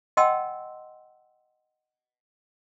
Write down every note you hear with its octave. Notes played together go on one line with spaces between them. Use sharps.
D#5 F#5 G5 A5 C6 E6